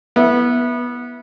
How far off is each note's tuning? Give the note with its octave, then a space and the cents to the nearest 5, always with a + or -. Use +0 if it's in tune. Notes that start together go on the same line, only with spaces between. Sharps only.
B3 -20 E4 +0